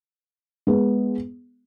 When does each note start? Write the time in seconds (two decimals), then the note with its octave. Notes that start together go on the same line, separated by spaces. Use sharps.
0.67 G#3 B3